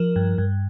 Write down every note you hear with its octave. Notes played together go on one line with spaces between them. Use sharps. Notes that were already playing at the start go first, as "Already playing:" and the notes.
Already playing: F3 A#4
G2
G2